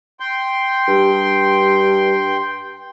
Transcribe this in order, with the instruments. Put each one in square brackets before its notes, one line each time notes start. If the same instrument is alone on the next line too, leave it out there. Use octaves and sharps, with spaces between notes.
[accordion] G5 C6
[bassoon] G2